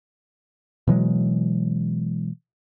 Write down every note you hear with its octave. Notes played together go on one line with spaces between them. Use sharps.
B2 E3 F#3 G#3